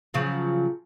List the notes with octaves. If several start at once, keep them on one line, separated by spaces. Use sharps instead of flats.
C#3 F3 F#3